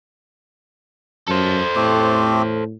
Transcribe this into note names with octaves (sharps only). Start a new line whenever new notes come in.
F#2 A4 C5
A2 A3 C4 G4